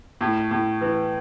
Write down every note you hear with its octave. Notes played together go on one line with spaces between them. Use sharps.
A2
A2
E3